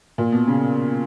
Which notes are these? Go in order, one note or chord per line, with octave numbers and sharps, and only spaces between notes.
A#2
B2
C#3